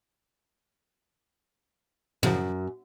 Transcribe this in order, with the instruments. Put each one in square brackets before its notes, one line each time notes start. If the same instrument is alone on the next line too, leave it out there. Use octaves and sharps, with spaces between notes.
[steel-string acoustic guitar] F#2 [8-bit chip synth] A2 C#3 F3